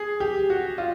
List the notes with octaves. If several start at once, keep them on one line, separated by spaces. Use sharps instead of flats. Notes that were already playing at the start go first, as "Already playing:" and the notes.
Already playing: G#4
G4
F#4
F4